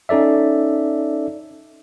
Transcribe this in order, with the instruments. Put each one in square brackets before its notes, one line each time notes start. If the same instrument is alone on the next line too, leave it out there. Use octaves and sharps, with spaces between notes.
[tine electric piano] C#4 D#4 A4 D5 E5